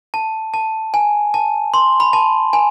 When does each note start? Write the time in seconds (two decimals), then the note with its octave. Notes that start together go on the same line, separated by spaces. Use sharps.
0.14 A5
0.54 A5
0.94 G#5
1.34 A5
1.74 C6
2.00 B5
2.13 A5
2.53 G#5